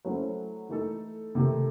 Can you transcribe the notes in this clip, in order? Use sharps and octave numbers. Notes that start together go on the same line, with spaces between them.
F#3 A3 C#4 E4 C5
E3 A3 D#4 A4
C3 D#3 A3